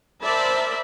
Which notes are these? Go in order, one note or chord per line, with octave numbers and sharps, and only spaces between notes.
A#4 C5 D5 E5 A5 B5